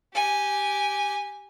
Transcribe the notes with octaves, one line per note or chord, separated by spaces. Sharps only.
G4 G#5